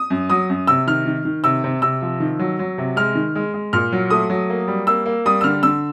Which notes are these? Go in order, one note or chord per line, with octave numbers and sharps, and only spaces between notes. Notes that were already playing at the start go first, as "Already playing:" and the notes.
Already playing: D#6
F#2
F#3 D#6
F#2
C3 E6
D#3 F6
D#3
D#3
C3 E6
C3
C3 E6
F3
D#3
F#3
F#3
C3
G#3 F6
D#3
G#3
G#3
A#2 F6
F#3
A3 D#6
F#3
A#3
G3
A#3 E6
A#3
G3 D#6
E6
D3 F6
D3 E6